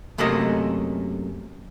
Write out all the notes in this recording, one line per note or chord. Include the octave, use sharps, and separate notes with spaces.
F#2 C3 A3 A#3 A4 D#5